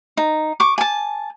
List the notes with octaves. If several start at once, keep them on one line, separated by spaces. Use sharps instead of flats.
D#4
C#6 D6
G#5 A5